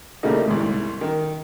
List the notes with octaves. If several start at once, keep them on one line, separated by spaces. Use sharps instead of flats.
A2 C#3 G3 A3 A#3 D#4
C2 G#2
D#3